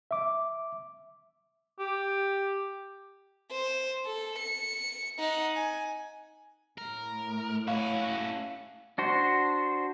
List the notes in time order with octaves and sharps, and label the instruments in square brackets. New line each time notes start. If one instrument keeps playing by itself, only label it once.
[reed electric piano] E5 D6
[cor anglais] G4
[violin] C5
A4
C#7
D#4 F#5
G#5
[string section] A2 [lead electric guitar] A#4
[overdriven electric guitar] C#4 E4 [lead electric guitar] F#4 [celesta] F5
[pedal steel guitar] D4 F#4 C5